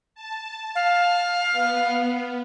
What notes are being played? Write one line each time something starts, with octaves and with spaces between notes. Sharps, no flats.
A5
F5
B3